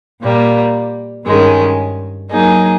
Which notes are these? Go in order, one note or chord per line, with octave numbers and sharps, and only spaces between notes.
A#2 G3 A#3
G2 D#3 G#3 C#4
F#3 A#3 D#4 G#4